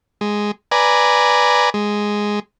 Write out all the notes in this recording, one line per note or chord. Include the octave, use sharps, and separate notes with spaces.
G#3
B4 D5 G#5 A#5
G#3